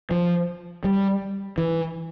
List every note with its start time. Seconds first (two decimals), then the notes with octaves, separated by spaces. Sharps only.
0.11 F3
0.84 G3
1.58 E3